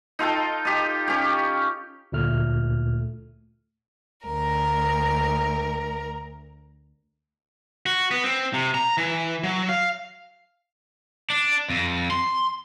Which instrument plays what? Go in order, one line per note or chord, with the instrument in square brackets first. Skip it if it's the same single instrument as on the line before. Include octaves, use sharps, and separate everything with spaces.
[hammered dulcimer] D#4 F4 A4 G5
G4 D#5
C#4 G4
[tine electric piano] D2 A#2 A3 F6
[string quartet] D2 A#4 A#5
[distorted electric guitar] F#4
B3
C4
C3
A#5
E3
F#3
F5
[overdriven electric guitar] D4
F2
C6